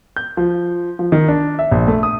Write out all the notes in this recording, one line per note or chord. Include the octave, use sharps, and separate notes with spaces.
G6
F3
F3
D#3
D4
E5
A#1
A3
D#6